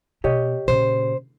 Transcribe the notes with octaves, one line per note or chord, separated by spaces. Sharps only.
B2 G4 C#5 D#5
A#2 C#3 C5